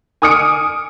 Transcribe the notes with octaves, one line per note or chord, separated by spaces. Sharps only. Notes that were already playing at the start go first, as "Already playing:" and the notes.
G#5 D6 D#6 F6 C#7 D7